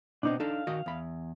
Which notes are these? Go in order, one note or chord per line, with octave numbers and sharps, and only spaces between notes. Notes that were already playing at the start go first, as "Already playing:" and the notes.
B2 B3 C4 D4 D#4
D4 D#4 A4 F5
D#3 F#4 D#5
E2 B5